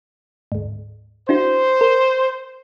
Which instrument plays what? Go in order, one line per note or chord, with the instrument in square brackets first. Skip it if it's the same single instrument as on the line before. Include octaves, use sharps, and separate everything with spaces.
[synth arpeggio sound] D2 G#2
[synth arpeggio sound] D4 E4 F#4 [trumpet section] C5
[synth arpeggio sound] A#4